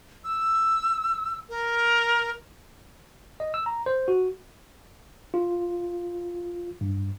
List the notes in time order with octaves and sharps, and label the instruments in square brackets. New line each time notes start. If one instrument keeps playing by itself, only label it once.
[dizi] E6
A#4
[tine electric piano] D#5
E6
A#5
C5
F#4
F4
G2